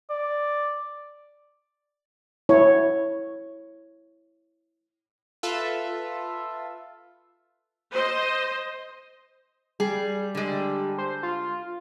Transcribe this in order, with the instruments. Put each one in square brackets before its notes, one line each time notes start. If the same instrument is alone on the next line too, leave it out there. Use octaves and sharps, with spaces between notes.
[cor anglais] D5
[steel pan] E4 C#5
[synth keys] F4 A4 B4 E5
[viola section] C5 D#5
[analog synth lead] G3 [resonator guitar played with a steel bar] G#4
[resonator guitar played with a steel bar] D3 G#3
[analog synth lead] C5
F4